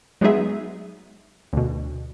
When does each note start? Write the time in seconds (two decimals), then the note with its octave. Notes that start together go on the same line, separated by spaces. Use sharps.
0.21 F#3 G#3 B3 D#4 G#4 E5
1.53 D2 B2